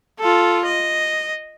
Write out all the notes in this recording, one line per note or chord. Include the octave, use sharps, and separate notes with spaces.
F4 A4
D#5